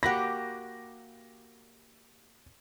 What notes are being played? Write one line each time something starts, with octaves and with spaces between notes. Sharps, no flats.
A#3 F#4 G4 F#5 B5 A#6